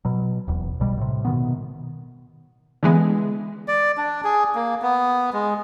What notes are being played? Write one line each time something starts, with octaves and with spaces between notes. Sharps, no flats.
B2 F#3
D#1 E2
B1 B2 G3
A2 C3
B2 D#3 B3
D3 E3 G#3 B3
D5
D4
G#4
A#3
B3
G#3